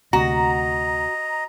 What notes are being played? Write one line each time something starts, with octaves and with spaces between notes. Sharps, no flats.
D2 C3 F#4 D#5 A#5